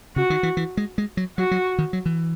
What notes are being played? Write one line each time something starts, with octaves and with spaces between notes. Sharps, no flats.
C#3 F#4
D#3
E3
E3
G#3
G#3
F#3
F#3 F#4
F#3
D#3
F#3
E3